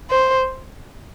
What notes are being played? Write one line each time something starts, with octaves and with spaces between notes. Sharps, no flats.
C5